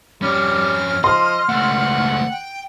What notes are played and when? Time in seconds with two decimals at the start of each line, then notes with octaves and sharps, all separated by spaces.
0.22 F2 G3 C#4 F6
1.04 F3 D#5 C6
1.49 C#2 A3 F#5
2.31 G5